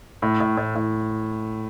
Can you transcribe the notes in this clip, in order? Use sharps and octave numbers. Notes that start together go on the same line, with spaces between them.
A2
A2
A2
A2